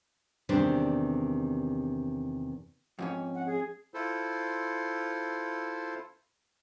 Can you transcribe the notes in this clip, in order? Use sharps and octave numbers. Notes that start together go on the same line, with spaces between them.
E2 C3 D#3 G3 D4 C5
F2 G#2 C#4
F#5
G#4
E4 F4 A4 C5